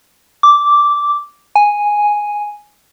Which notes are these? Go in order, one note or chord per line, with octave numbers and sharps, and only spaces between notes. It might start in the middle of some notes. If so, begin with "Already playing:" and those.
D6
G#5